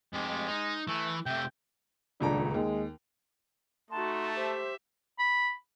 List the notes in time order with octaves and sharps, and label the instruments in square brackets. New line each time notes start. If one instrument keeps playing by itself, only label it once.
[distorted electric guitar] F2 G4 [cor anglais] G#3
[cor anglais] G#3
[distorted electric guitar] D#4
[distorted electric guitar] E3 [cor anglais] A3
[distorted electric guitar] C3 A3 [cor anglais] G5
[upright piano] D#1 C#2 A#5 [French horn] D4
[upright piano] D#2 [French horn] G#3
[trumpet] A3 [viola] D#4 F#4 [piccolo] A5 [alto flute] C6
[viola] G4 E5 [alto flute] C5
[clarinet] B5